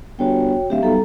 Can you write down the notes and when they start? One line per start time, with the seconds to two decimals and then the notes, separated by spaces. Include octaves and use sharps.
0.19 G1 F#4 C#5 G5
0.70 D1 G4 E5 F5
0.82 B1 G3 A4 A#5